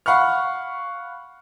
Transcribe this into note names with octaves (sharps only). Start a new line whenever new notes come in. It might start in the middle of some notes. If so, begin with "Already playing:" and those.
F5 F#5 B5 C#6 F6